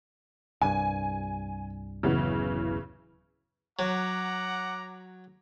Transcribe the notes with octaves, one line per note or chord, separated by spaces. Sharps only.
C2 G2 G#5
D1 F#2 C#3 E3 B3
F#3 F#5 A#5 D6